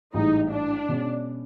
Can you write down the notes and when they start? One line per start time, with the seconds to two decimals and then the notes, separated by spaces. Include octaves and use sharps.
0.14 A1 G#2 E3 G3 D#4
0.52 D4
0.89 B2 G#3 C#4